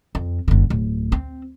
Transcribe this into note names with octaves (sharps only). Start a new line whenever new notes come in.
F2
F#1 D3
D1
C4